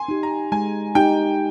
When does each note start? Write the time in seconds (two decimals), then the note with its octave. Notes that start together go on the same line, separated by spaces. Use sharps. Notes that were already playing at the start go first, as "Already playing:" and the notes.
Already playing: G#5 C6
0.08 D#4 G4
0.23 A#5
0.52 G#3 G#5
0.95 D#4 G4 G5